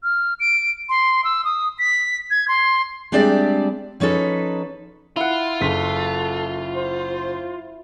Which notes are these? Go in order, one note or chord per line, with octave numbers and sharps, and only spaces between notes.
F6
D7
C6
E6
D#6
B6
G#6
C6
G3 G#3 C4 D4 D5 E5
F3 C#4 D#4 A4 B4
E4 F4 F#5
F#1 A4 B6
C5